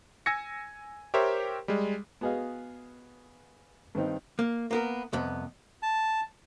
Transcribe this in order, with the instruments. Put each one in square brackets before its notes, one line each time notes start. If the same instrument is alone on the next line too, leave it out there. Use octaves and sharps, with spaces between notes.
[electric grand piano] G#5 E6 G#6 A#6 C#7
G4 A#4 C5 C#5 E5
G3 G#3
[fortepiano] B3 F#4 G#4 D#5 F5
G2 D#3 C4 D#4
[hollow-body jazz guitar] A#3
A#3 B3 A#4
C2 F2 B3
[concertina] A5